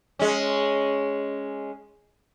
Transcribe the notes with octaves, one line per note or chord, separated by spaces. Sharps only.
G#3 C#4